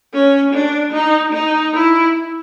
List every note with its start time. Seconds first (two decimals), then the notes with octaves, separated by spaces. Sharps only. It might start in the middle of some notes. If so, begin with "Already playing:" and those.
0.14 C#4
0.54 D4
0.93 D#4
1.33 D#4
1.74 E4